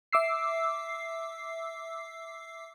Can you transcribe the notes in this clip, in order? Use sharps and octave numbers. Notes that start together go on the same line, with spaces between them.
E5 D6 E6 C7